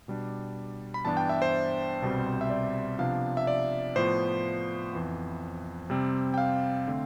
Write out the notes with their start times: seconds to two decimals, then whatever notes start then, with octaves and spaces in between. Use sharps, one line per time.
0.08 B2 G3 D4
0.94 B5
1.05 G2 E3 B3 D4 A5
1.17 G5
1.29 E5
1.42 C5
2.02 C2 B2 G3 C4
2.41 E5
2.50 D5
2.99 C3 F3 B3 D4 F5
3.37 E5
3.47 D5
3.96 A2 F3 B3 C5
4.93 F2 E3 B3
5.90 C3 G3 C4
6.34 G5
6.38 F5
6.87 D3 A3 C4